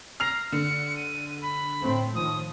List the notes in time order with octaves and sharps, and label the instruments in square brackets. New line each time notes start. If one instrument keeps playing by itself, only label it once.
[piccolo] A#5 [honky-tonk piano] F6 C7 F7
[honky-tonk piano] D3 [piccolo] C#7
[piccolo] D#7
B5
[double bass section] A2 A3 C4
[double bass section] A2 D#3 F3 [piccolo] D#6